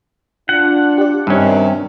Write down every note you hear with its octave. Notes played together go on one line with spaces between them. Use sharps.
D4 F4 F#5
G4 D5
G2 C3 D#3 C#4